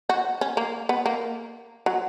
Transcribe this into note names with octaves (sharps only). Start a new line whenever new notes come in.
F#4
C#4
A#3
B3
A#3
F#3